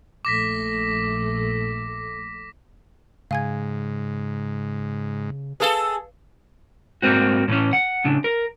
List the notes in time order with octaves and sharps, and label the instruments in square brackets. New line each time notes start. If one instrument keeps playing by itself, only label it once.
[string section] A#1 A3 [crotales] D6 A#6 B6
[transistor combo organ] G#2 [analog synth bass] C#3 [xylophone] F5 G#5 G#6
[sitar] G#4 A4 [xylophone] B4 F5 G7
[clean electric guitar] G#2 A3 A#3 C4 F#4
A2 E3 A3 C#4
F#5
A2 C#3 D4
A#4